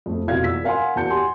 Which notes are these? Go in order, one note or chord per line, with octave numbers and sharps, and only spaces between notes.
F2 A3
F1 B2 E4 F4 F5 G#6
E2 E6 B6
A#4 F5 F#5 G#5 C6
E2 F#4 F#5 A5 G6 C#7
G4 G#5 C6